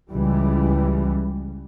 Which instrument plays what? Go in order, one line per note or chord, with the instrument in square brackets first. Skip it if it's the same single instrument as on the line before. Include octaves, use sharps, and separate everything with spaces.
[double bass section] C#2 E3 G3